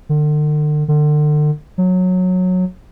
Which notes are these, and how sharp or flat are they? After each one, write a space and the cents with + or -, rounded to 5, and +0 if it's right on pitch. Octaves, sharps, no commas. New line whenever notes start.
D3 +40
D3 +35
F#3 -15